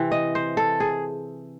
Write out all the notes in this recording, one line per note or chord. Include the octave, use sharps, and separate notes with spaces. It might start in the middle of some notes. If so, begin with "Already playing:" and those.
Already playing: C3 E3 C4
D#5
C5
A4
G#4